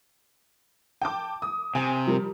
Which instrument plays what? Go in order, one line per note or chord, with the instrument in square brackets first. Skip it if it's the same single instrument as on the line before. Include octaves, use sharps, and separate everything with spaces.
[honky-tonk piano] G5 A5 D6
D#6
[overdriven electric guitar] C3 [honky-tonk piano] G#5
[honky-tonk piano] F3 G3 A#4